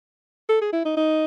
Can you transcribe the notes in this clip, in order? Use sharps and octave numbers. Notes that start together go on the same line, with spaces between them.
A4
G#4
E4
D#4
D#4